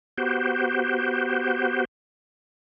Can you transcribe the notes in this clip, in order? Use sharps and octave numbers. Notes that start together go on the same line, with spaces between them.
B3 F#4 G4 C5